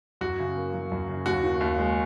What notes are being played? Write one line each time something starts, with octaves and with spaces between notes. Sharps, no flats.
F#2 F#4
C#3
A#3
F#3
F#2
C#3
D#2 F#4
D#3
D#2
G#3